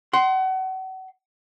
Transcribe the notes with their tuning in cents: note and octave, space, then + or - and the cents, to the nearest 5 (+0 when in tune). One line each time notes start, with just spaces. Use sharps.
F#5 +35 C6 +0